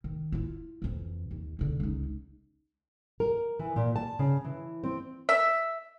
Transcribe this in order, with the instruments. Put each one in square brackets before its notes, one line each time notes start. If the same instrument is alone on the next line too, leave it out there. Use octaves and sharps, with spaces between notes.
[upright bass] D#3
E4 F4
F2 E3
D#2
E2 D3
C#2 D#4
[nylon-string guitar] A#4
E3
A#2
A5
C#3
E3
C4
[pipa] E5